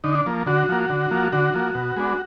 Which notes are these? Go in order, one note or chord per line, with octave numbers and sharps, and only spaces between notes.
D3 D#4
D4
F3 A#3
D3 F#4
F3 A#3
D3
F3 A#3
D3 F#4
F3 A#3
B2
G#3 B3 D4